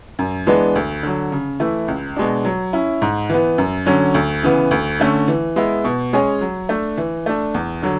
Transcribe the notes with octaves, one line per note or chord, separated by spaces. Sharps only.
F#2
E3 G#3 B3 D4
D2
D3 F#3
C#3
E3 A3 E4
C#2
B2 G#3 D4
F#3
C#4 E4
G#2
E3 B3
F#2
D3 F#3 C#4
D2
C#3 E3 B3
D2
D3 A3 C#4
E3
G#3 B3 E4
B2
G#3 C#4 G#4 C#5
F#3
A3 D4
E3
A3 D4
E2
D3 F#3